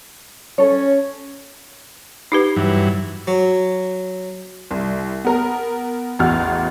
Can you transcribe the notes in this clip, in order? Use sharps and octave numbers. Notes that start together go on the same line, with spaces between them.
C#4 A4 C#5
D#4 G4 B4
G2 E3 F#3
F#3
C2
B3 A#4 A#5
A1 E2 F#4 F6